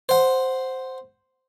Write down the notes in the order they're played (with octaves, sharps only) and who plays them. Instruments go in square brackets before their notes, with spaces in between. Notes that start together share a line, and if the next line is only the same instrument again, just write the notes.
[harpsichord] C5 F#5